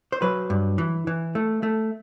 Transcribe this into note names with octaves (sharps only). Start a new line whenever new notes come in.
C5
F#3 B4
G2
E3
E3
A3
A3